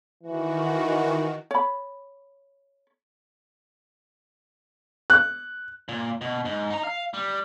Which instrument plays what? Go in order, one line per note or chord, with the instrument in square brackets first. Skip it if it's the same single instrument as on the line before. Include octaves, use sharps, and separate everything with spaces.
[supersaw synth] D#3 F#4 [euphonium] E3
[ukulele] C#5 B5
[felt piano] F#6
[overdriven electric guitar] A#2
B2
G#2
D#4 A#5
F5
G3